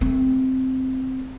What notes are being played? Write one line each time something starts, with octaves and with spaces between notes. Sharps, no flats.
A3 C4